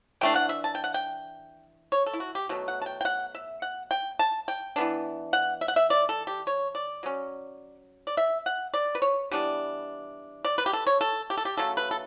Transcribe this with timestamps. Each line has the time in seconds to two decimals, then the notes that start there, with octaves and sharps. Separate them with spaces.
0.21 E3 A3 D4 G5
0.36 F#5
0.49 E5
0.64 A5
0.75 G5
0.84 F#5
0.94 G5
1.92 C#5
2.06 A4
2.14 E4
2.20 F#4
2.35 G4
2.49 B2 F#3 A3
2.68 F#5
2.82 A5
2.86 G5
3.01 G5
3.05 F#5
3.35 E5
3.62 F#5
3.91 G5
4.19 A5
4.48 G5
4.76 E3 B3 D4
5.33 F#5
5.61 E5
5.68 F#5
5.76 E5
5.90 D5
6.09 A4
6.27 G4
6.47 C#5
6.75 D5
7.03 F#3 C#4
8.07 D5
8.17 E5
8.46 F#5
8.74 D5
8.95 B4
9.02 C#5
9.31 E3 G3 B3 D4
10.45 D5
10.58 B4
10.66 G4
10.73 A4
10.87 C#5
11.01 A4
11.30 G4
11.38 A4
11.45 G4
11.57 C#3 F#3 A3 A4
11.77 B4
11.91 A4